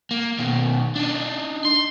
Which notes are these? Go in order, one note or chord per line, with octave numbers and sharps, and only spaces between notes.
A#3
B2 D#3
D4 D#4
C6